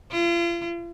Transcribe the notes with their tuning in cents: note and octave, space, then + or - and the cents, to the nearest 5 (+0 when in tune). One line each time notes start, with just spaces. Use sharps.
F4 -40